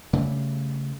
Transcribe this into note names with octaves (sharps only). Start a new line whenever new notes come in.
C#3 G3 A3